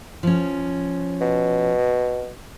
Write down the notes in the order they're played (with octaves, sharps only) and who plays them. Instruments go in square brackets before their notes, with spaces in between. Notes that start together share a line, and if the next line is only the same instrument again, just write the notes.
[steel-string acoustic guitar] F3 C#4
[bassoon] B2